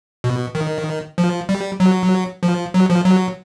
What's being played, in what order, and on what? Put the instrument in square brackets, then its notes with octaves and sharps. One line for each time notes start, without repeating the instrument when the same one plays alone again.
[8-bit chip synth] B2
D#3
F3
G3
F#3
F3
F#3
F3
F#3